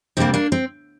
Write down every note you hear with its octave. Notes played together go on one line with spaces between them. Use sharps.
D2 C3 G3 A#3 C4
A#3 D4
C4